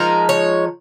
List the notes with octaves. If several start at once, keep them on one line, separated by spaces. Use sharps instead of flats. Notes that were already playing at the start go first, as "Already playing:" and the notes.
Already playing: F3 G#3 D#4 A#4
C#5